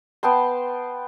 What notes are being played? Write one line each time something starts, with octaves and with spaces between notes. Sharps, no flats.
B3 G5 A5 C6